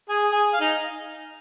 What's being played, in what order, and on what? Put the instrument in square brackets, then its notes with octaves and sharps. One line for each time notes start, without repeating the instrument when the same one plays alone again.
[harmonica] G#4 G#5
G#4 G#5
F5
D#4 D#5